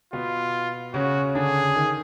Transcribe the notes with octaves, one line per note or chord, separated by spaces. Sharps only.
B2 B3 F4
C#3 C#4 F#4
D3 D4 G#4
D#3 D#4